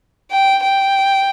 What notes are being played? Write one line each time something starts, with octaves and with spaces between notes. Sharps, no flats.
G5
G5